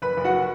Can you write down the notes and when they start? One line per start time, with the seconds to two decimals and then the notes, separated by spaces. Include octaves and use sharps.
0.02 F#1 B4 B5
0.17 F#1
0.24 F#4 F#5